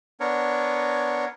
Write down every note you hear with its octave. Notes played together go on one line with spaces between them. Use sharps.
B3 D4 A#4 C#5